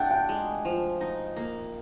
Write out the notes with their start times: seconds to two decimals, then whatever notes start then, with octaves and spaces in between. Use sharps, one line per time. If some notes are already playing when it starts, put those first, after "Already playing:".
Already playing: A3 D4 F#5 G5
0.11 G5
0.29 G#3
0.65 F3
1.01 D#4
1.37 A#3